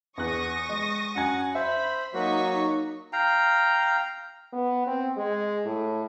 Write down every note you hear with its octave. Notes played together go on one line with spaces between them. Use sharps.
E2 C#6 D#6 F#6 A#6
G#3
F#2 F#5 G#5
C5 E5 B5
F#3 A#3 D#4 F#4 C#6 B6
F5 G5 A#5
B3
C4
G#3
A2